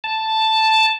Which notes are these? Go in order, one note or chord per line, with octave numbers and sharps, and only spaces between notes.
A5